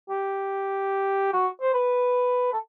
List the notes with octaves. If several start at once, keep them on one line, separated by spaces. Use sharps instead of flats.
G4
F#4
C5
B4
A4